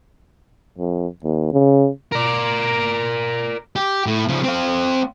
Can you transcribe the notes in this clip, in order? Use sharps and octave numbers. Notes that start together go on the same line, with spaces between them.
F2
D#2
C#3
A#4 D5
G4
A2
C#3 F3
C4 F5